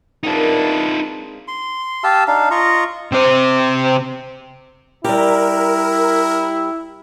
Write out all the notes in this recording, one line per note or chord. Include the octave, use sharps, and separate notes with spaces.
G#3 C4 D4 D#4 F4 A#4 B4
C6
G4 F5 A5 E6
D4 D#4 F5
F4 D#5 A#5 C#6
C3 C5
G3 E4 G4 A#4